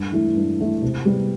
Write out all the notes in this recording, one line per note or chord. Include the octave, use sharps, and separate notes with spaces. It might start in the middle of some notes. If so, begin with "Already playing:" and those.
Already playing: G2
E3 A3 E4
G2
E3 A3 E4
C3
G3 B3